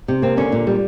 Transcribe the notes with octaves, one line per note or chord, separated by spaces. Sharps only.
C3
A#3 C4
D3 C#4
A#2
G3